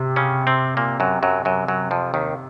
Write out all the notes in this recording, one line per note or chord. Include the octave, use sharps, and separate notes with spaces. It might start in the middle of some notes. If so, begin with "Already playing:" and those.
Already playing: C3
C#3 C#4
C3 C4
A#2 A#3
F#2 F#3
F#2 F#3
F#2 F#3
F#2 F#3
F2 F3
D#2 D#3